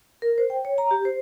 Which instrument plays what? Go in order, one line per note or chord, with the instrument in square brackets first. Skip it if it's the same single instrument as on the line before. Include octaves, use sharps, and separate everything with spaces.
[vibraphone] A#4
C5
G5
C#5
A#5
G4
C5